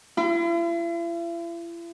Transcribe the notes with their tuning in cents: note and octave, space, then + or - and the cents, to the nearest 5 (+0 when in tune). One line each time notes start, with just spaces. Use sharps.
E4 +45